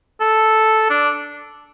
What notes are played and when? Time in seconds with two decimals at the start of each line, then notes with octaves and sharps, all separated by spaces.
0.21 A4
0.90 D4